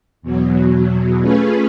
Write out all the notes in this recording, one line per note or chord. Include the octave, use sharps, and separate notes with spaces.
E2 B2 F#3
A3 C#4 F4 G#4 B4